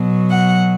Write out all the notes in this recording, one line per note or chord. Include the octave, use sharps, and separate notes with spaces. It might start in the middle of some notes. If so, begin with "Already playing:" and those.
Already playing: B2 F#3
F#5